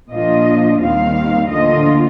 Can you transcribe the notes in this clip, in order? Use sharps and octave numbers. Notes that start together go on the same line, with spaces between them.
A#2 F3 A#3 D4 F4 D#5
D#2 D#3 G3 C4 F5
D2 D3 F3 A#3 F4 D#5